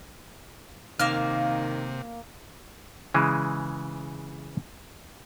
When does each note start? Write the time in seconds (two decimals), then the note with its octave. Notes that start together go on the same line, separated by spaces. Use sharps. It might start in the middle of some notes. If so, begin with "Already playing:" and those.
0.99 C3 D#3 A#3 F5 F6
3.14 C#3 E3 G#3